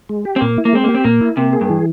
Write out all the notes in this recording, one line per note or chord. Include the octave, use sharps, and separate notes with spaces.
G#3
G4
C4
A#2 A#3
E4
A#3
G#3 C4
A#3 G4
C4
A#2 A#3
E4
C3 A#3
G#4
G2
E3